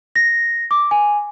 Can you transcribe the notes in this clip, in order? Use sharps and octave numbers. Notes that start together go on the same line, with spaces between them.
A#6
D6
G#5